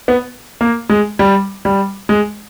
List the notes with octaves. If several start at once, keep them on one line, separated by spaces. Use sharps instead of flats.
B3
A#3
G#3
G3
G3
G#3